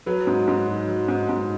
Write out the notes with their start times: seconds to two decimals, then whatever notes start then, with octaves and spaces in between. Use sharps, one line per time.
0.06 F#3 B4
0.27 G#2
0.47 G#2
0.67 F#3
0.88 F#3
1.08 G#2
1.29 G#2